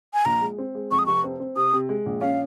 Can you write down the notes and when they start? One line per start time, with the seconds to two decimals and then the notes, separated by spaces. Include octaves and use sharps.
0.14 G#5
0.25 A#1 A#5
0.41 G#3
0.58 C4
0.75 G#3
0.91 F2 C#6
0.99 D#6
1.06 F1 C#6
1.24 C4
1.40 C4
1.56 C3 D#6
1.73 C3
1.89 G#3
2.06 A#1
2.21 C#4 F5